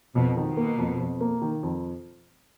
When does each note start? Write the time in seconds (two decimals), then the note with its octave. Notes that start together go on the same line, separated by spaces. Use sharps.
0.15 F2 B2
0.37 D#3
0.47 B2
0.57 A#3
0.78 F2
1.00 F2
1.21 A#3
1.42 D#3
1.63 F2